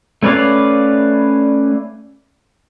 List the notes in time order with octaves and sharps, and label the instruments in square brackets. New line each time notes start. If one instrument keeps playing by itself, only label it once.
[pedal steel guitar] A3 C#4 B4 D5 F5